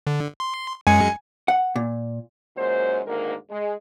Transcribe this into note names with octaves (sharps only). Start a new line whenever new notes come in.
D3
C6
F#2 G#3 G#5 C#7
F#5
A#2
F#2 A#2 G#3 C5
D2 G#2 D#3 A#3 A#4
G#3